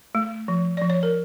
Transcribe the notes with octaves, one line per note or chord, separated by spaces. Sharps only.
A3
F3
F3 D5
C#5
A#4